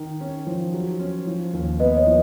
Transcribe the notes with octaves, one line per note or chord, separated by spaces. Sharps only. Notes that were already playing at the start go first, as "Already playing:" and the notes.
Already playing: D#3
C#4
F3
F#3
C#4
F3
D#2
B3 B4 D#5
C#5
F3